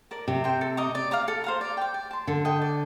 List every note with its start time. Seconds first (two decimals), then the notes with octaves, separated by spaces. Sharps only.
0.11 A#4 D5 A5
0.27 C3 G4
0.44 C5 G5
0.61 A4
0.77 D#5 A#5 D6
0.95 D5
1.11 F5 A#5 D6
1.28 A4
1.44 C5 F5 A#5
1.61 D5
1.77 G5 D6
1.94 D5
2.11 A5 C6
2.27 D3 A4
2.45 D#5 G5
2.61 D5